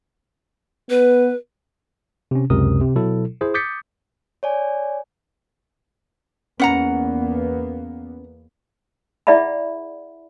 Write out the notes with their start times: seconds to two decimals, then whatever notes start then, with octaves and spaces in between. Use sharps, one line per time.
0.90 B3 B4
2.31 C3 C#4
2.50 C#2 F#2 C3 A#4 D#6
2.81 C3
2.95 B2 F#3 E4 A4
3.41 E4 G#4 C5
3.54 D6 D#6 G6 A6 B6 C#7
4.43 C#5 D5 G#5
6.60 E2 A#3 B3 C#4 F#5 A#5
9.27 E4 G#4 D5 E5 F#5 B5